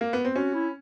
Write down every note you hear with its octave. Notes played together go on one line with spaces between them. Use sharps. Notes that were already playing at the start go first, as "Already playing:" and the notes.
A#3
B3
C4
C#4 F#4
E4